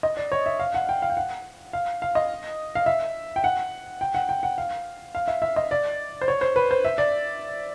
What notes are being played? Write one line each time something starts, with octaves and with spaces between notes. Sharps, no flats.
D#5
D5
C#5
E5
F5
F#5
G5
F5
G5
F#5
F5
F5
D#5
F5
E5
G5
F#5
G5
F#5
G5
F#5
F5
F5
E5
E5
D#5
D5
C5
C#5
C5
B4
C5
E5
D5